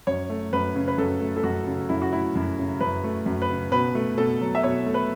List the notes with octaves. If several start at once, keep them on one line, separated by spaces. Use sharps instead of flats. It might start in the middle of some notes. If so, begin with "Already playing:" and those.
F#2 C#5
A3
F#2 B4
C#3
B4
F#2 A4
A3
A4
F#2 F#4
C#3
F#2 E4
F#4
A3 E4
F#2
C#3
F#2 B4
A3
F#2
B4
C#3
B2 B4
A3
B2 A4
F#3
E5
B2 C#5
A3
B4